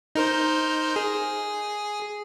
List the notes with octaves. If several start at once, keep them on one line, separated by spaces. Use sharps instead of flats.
D#4 A#4 C5
G#4